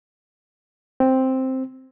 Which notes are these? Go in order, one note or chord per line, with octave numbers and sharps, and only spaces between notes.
C4